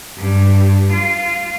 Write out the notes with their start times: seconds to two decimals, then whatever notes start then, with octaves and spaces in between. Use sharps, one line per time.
0.17 G2
0.92 F4